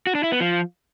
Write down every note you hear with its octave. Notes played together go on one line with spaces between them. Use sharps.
F#4
D4
E4
B3
F3